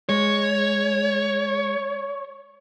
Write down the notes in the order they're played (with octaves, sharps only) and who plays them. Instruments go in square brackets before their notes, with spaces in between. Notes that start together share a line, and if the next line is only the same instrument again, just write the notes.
[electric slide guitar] G#3 [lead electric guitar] C#5